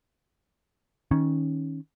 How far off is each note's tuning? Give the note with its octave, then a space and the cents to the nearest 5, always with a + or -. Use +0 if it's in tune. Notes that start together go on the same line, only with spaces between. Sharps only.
D#3 +15 C#4 -5